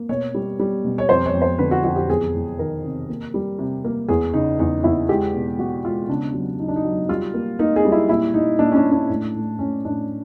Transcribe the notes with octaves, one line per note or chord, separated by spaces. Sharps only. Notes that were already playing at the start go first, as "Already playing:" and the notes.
Already playing: A#3
B2 C#5
G3
G3
B2
C#5
F2 C5
C#5
F2
C5
D3 B4
F#4
F2 F#4
G4
E2 G#4
E2
D#3 A#4
C3
A#3
G3
C3
A#3
E2 G#4
C#3 D#4
E2 D#4
E2 E4
G#3 G4
B2
B2 F#4
G#3 F4
C#3 D4
F#3
F#3 D#4
D4
D#4
F#3
G3 F4
A#3
A#3 D#4
G#4
G3
E4
A#2 E4
A#2 D#4
A#2 D4
C#4
D4
A#2
D4
A2
A2
A2 C#4
A2 D4